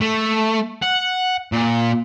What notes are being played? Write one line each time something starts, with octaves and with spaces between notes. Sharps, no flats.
A3
F#5
A#2